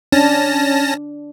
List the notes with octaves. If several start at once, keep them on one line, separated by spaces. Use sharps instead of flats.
C#4 D4 A5 A#6